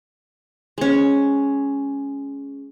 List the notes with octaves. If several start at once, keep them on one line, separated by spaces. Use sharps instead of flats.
G#3 C#4